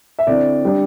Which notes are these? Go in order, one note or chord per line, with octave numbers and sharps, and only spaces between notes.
E5
D3 C4 E4 D5
G3 D4